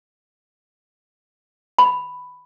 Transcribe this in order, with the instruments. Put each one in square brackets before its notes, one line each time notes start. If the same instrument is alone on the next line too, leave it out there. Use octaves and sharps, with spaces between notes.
[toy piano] B5